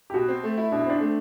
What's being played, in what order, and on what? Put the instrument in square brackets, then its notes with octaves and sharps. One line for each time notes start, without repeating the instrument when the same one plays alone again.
[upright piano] G4
[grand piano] B2 [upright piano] F#4
[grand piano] C4
A3
E4
[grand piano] B2 [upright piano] D4
[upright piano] E4
[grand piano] C4 [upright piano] D4
[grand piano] A3